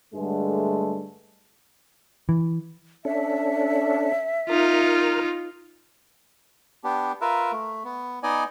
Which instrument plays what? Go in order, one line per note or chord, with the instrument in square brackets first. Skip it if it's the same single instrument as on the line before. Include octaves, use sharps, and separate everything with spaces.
[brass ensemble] G2 D3 G#3 A3
[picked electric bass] E3
[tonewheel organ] C#4 D4 A4 [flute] E5
[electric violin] D#4 F4 [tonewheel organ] A#4 F6
[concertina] B3 D4 G4
F4 A#4 B4 E5
A3
B3
B3 D#4 D5 D#5 G#5